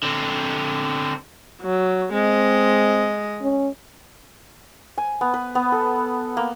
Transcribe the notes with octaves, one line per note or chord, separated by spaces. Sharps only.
D3 C4
F#3
G#3 C4 D#5
C#4
G#5
B3
B4
B3
A4
A#3